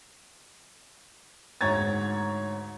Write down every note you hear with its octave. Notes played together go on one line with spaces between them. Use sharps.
D2 G#2 C#5 A#5 G#6 A6